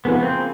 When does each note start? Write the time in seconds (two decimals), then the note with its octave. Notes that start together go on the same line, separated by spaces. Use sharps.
0.05 C#3 F3 A#3 B3 C#4 E4
0.23 C4